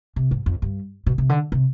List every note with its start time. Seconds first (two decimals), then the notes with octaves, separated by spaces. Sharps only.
0.16 C3
0.31 G#2
0.46 F2
0.62 G2
1.06 B2
1.18 C3
1.29 D3
1.52 C3